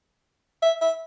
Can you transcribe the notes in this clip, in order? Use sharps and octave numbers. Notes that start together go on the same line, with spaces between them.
E5
E5